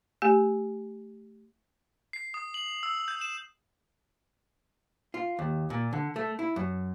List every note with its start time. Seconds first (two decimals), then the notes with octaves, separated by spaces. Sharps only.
0.22 A3 G4 G#5
2.13 C7
2.34 D#6
2.54 F#7
2.83 E6
3.08 G6
3.21 E7
5.14 F4
5.39 D#2
5.70 A#2
5.93 D3
6.16 A3
6.39 E4
6.56 F#2